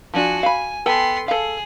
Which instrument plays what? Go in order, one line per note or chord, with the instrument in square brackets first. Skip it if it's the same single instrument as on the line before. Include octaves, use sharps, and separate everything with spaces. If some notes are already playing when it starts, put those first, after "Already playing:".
[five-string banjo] F3 D4 [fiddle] F#4 G#5
[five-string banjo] F5 B5 [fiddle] G#5
[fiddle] B3 C6 [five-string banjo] A4 G5 G#5
[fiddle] G#4 [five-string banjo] A4 F5